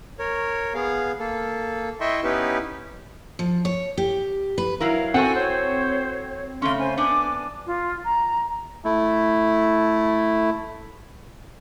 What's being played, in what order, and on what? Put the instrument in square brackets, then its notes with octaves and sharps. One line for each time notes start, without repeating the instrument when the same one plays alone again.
[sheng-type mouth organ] A#4 C#5
B3 G#4 F5
A#3 A4
E4 D#5 E5 G5 C6 C#6
B3 C#4 D#4 E4 G4 B4
[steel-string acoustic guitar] F3
C#5
G4
B4
[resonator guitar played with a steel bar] F#3 E4 A#4 [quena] F5
[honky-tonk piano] C4 [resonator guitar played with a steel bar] F#4 A4 F#5 [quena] G#5
[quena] C5 [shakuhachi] C#5
[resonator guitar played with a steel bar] C#3 A3 C#4 [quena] C6
[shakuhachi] C5 [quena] G#5
[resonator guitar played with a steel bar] B3 D4 [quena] G#5 [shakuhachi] D6
[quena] F4
A#5
[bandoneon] A3 E4